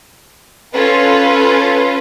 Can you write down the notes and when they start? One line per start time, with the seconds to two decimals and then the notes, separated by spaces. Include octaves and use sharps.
0.74 C#4 F4 A4 B4